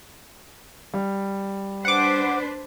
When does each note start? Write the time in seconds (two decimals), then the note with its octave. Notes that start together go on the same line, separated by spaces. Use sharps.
0.93 G3
1.85 D4 B4 C5 F#5 D6